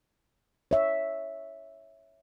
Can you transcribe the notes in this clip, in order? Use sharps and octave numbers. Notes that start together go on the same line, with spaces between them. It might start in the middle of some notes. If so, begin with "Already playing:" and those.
C#5 E5